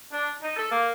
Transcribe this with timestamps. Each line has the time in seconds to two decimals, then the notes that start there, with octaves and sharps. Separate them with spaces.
0.11 D4
0.42 D#4
0.56 A4
0.70 A#3